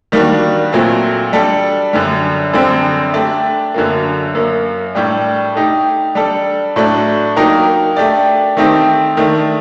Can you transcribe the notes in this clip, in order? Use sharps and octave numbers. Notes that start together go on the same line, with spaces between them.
D#3 G3 A#3 D4 F#4
A#2 F#3 A3 C4
G3 D4 A4
F#2 D3 G3
F#2 D3 G3 C4
A3 D4 G4 D5
F#2 D3 F#3 A#3
F#2 F#3 A#3
A2 G3 D4 G4
A3 D#4 G4
G3 D4 A4
A2 F#3 A3 D4
F#3 A#3 D#4 G4 A#4
A3 D4 G4 D5
D#3 A3 C4 D#4 G4
D#3 A3 D4